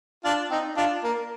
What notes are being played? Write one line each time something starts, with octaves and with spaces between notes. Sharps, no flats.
D4 F4
C4 D#4
D4 F4
A#3